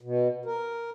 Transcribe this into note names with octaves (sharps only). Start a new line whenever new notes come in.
B2
A#4